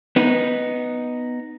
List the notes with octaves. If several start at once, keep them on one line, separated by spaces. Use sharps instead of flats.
B3 D#4